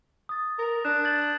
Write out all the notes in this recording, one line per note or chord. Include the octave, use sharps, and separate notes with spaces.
D#6 A6
A#4 D#6
D4 F#6 E7
G6 A6 F#7